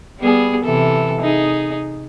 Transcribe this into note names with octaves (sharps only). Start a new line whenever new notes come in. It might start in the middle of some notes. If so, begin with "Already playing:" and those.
G3 B3 G#4
C3 E3 A4
D#4 G#4